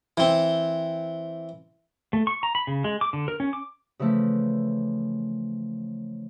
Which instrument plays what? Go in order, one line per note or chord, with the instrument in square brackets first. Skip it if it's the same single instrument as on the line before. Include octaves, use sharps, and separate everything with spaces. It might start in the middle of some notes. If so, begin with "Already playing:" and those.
[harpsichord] E3 C4
[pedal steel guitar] A3
C#6
A#5
B5
C#3
G#3
D6
D3
A#4
C#4
D6
[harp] C#3 E3 F3 A3 B4